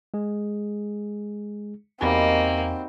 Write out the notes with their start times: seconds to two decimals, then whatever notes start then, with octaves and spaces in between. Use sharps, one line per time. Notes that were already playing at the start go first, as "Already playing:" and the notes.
0.14 G#3 G#4
2.01 E2 G3 A#3 C4 D#4 F#4 G#5